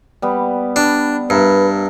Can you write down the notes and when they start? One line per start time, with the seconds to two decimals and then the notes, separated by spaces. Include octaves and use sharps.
0.22 G3 B3
0.76 G3 D4
1.30 G2 A#4 B4 E5